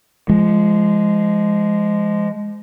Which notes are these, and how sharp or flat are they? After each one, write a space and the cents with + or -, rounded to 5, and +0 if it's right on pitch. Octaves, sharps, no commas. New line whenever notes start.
F3 -25 G#3 +0